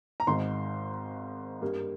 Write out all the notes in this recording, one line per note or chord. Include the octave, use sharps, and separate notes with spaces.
A#5
G#1 G#2 D#3 C6
G2 G3 A#3